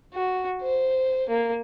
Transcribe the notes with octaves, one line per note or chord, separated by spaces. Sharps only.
F#4
C5
A#3